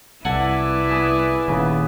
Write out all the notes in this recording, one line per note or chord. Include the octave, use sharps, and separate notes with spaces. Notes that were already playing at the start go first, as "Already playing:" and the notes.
C2 E4 A4 B4 D5 F#5 G#5
B3 G#4
D#1 D#2 C#3 B3